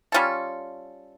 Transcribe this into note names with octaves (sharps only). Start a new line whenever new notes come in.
G3 C#4 F4 A4